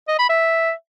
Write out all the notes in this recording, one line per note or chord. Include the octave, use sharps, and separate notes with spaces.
D#5
B5
E5